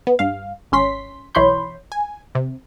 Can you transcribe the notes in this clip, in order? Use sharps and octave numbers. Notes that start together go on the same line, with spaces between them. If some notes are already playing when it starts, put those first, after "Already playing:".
B3
G2 F5
G#1 C#4 C6 B6
B1 E3 C#5 B5 C6 G6
G#5
C3